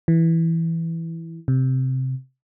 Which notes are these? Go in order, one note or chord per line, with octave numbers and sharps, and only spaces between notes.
E3
C3